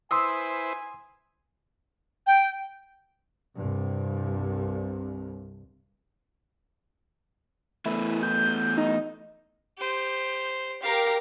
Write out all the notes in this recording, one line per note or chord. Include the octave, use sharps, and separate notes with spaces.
E4 B4 C5 G#5 C6 D#6 E6
G5
C2 G2
E3 A3 B3 E4
G6
D#4
G4 C5
G4 A#4 F5 A#5